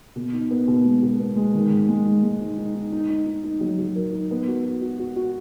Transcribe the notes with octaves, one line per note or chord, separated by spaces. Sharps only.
B2
D#4
B3
B2
G#3
B2
B3
G#3
D#3
G#2
G#3
D#4
G#3
D#4
D#4
D#4
D#4
D#4
D#4
D#4
F#3
F#3
A#4
D#4
B3
F#4
F#4
F#4
F#4
F#4